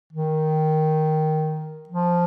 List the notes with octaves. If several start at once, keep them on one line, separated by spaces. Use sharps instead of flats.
D#3
F3